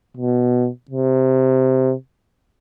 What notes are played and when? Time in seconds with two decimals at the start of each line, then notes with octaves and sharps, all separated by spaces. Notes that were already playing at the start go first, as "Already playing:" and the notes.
0.17 B2
0.91 C3